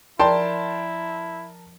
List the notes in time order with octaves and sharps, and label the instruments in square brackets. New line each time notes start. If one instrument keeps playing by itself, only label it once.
[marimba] F3 D5 [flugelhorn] E4 [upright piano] A#4 A5 [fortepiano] G5 C6